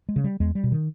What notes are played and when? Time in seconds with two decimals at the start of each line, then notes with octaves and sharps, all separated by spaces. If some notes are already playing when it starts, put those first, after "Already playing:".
0.09 G#3
0.16 C#3
0.24 G3
0.40 E2 G#3
0.55 G3
0.64 B2
0.72 D#3